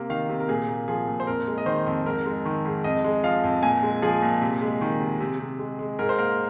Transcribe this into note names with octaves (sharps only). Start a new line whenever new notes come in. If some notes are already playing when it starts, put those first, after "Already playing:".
Already playing: C3 A#3
D#3 F5
C3
A#4
A#2 G#4
A#3
F3 G#4
A#2
C5
F2 A#4
G#3
D#5
D#3 C5
F2
G#2 A#4
G#3
D#3
G#2
F2 D#5
G#3
F3 F5
F2
A#2 G#5
G#3
F3 G#4
A#2
C3
G#3
D#3
C3
C3
C3
G#3
G#3
G#2 A#4
C5
A#3 A#4